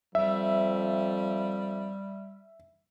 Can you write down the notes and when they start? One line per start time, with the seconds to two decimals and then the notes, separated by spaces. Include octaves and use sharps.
0.15 F2 G3 E5